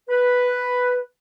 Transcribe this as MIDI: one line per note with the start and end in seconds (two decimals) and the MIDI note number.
0.09 1.00 71